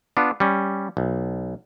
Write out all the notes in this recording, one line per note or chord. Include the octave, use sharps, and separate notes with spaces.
B3 D4 F4
G3 C#4
B1